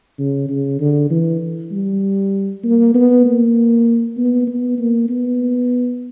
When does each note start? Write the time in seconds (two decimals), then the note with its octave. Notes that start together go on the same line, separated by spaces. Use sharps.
0.19 C#3
0.49 C#3
0.80 D3
1.10 E3
1.72 G3
2.63 A#3
2.95 B3
3.25 A#3
4.17 B3
4.47 B3
4.79 A#3
5.09 B3